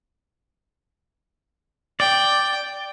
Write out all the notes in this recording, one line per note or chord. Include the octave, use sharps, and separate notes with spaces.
D5 G5